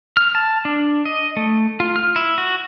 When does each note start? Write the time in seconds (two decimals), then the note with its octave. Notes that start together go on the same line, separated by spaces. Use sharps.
0.17 F6
0.35 A5
0.65 D4
1.05 D#5
1.37 A3
1.80 F4
1.96 F6
2.16 E4
2.38 F#4